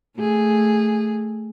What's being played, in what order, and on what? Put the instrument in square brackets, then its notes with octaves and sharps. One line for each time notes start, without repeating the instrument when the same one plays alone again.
[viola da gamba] A3 G#4